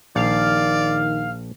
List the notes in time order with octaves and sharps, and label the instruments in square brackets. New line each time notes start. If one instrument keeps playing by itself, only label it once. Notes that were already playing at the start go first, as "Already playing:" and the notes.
[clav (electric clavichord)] A#1 [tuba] D#3 [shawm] D5 [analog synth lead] F5